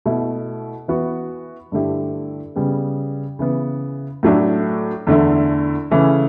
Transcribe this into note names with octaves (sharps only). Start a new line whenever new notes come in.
B2 A3 E4
E3 B3 F#4
G2 D3 A3 E4 G4
C#3 G3 B3
C#3 E3 B3
A2 F#3 A3 D4
E2 D3 A3 E4
C#3 E3 A3 C#4